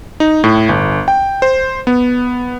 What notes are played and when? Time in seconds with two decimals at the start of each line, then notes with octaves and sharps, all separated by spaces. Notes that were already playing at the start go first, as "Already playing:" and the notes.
0.20 D#4
0.44 A2
0.69 G1
1.08 G5
1.42 C5
1.87 B3